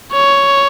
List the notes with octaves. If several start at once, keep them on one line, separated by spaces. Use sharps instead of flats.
C#5